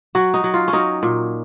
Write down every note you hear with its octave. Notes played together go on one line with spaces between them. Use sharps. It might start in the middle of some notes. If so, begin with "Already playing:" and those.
F#3 F#4
D#4
F#3
F4
C#4
F#3 D#4
A#2